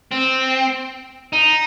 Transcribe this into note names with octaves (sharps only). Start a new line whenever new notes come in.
C4
D#4